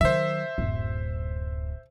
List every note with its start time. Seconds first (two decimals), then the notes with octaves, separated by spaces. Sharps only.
0.01 D#3 F#3 C5 E5
0.58 D1 F#2